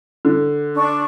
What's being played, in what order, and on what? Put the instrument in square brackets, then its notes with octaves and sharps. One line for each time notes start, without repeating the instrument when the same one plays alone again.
[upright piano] D3
[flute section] D4 C#6